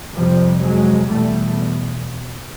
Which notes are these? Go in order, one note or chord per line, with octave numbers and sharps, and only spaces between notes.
F2 C3 F3 G3
F#3 G#3
E2 B2 G3 A3